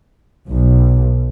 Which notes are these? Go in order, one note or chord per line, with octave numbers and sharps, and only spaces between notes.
B1